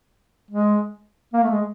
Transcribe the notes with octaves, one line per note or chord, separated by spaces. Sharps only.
G#3
A#3
A3
G#3